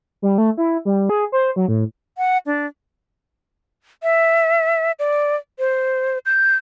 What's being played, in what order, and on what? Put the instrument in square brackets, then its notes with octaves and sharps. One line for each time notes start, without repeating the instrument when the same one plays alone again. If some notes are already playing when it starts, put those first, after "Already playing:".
[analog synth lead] G3
A3
E4
G3
G#4
C5
F#3
A2
[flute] F#5
D4
[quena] E5
D5
C5
G6